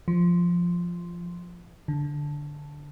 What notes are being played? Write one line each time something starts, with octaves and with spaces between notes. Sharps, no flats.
F3
D3